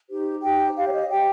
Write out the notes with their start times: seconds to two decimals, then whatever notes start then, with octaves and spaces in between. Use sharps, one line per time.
0.09 D#4 G4 C5
0.42 D#4 G4 C5 G5
0.76 G4 C5 F5
0.88 C#5
0.93 D#5
1.10 G4 C5 G5